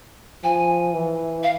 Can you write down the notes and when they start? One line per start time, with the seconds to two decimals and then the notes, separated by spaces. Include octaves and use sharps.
0.44 F3 G#5
0.94 E3
1.43 F5